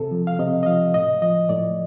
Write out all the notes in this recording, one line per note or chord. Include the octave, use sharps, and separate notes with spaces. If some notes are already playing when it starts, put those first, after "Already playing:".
Already playing: C3 A4
F3
F5
C3 D#5
D#5
F3 F5
A2 D#5
F3 D#5
A2 D5